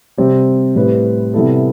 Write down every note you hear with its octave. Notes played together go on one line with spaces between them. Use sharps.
C3 G3 C4 G4
A2 G3 C4 G4 B4
C3 G3 B3 E4 A4